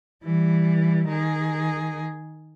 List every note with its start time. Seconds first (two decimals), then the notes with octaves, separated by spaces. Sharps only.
0.24 E3 G3
1.08 D#3 G#4